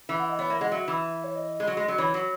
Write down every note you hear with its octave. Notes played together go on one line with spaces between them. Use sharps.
E3 E5
F#5
D#5
B3 C#5
A#3 E5
G#3 F#5
F#3 E5
E3
C#5
D#5
G#3
F#3
G#3
F#3
E3 C#5
F#3